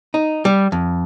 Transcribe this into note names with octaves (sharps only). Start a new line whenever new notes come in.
D#4
G3
F2